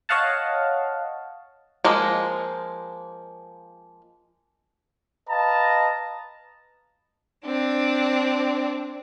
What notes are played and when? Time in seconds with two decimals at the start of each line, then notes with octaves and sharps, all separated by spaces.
0.09 C#5 D#5 F5 F#5 A5
1.84 F3 G#3 A#3
5.28 B4 D#5 F5 A5 A#5
7.44 C4 D4